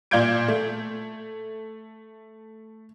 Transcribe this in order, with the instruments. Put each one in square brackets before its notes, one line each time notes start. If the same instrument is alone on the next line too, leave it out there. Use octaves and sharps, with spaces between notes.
[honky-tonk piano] A#2 D5 F5 G6 G#6 D7
A3